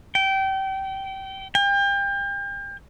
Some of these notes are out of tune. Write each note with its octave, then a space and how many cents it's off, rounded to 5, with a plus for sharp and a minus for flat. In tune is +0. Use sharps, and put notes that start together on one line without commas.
G5 -25
G5 +35